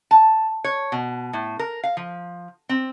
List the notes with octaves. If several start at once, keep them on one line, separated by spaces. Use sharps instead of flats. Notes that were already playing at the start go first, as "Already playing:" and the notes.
A5
C#5
B2
A2
A#4
F5
F3
C4